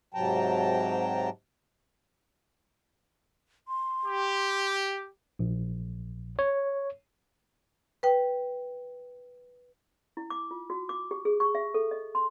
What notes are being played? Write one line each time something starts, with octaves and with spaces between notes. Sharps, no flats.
G#2 C3 F#3 G5 A5 A#5
C6
G4
A#1
C#5
B4 G5
E4
D6
F4
F#4
D6
G4
G#4
C#6
E5
A4
D#5
C6